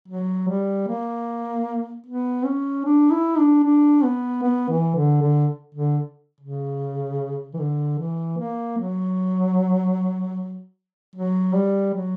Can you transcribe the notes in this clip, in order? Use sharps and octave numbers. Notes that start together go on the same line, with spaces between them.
F#3
G3
A#3
B3
C#4
D4
E4
D4
D4
B3
B3
E3
D3
D3
D3
C#3
E3
D3
E3
A#3
F#3
F#3
G3
F#3